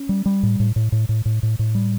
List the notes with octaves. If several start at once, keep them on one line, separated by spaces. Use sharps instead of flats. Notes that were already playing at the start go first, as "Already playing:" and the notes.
Already playing: C#4
G3
G3
A2
A2
A2
A2
A2
A2
A2
A2
G3